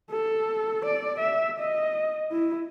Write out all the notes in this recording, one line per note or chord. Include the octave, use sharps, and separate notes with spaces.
A4
D5
E5
D#5
E4